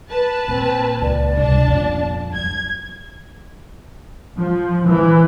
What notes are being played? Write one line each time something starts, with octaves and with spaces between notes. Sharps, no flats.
B4 A5
A#2 C4
C#2 D5
C2 G2 D4 A5
G1 F2 A#2
F#3 G#6
F3
E3